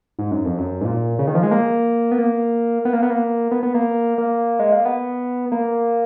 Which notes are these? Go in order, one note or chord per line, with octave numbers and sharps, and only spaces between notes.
G#2
F#2
F2
F#2
G#2
A#2
C#3
D#3
F3
G#3
A#3
B3
A#3
B3
A#3
B3
A#3
B3
B3
A#3
A#3
G#3
A#3
B3
A#3